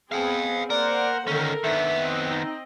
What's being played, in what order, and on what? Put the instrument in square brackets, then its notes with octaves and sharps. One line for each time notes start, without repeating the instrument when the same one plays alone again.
[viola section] B3 C4 G#4 [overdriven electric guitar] F5 G5
[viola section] A#3 C5 F#5 [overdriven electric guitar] A#4 [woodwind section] D5
[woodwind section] D3 D#3 [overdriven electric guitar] C#4 D#4 [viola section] A4 A#4
[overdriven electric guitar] D#3 B3 [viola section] D4 [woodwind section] E5
[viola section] C4 D#5
[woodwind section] D#4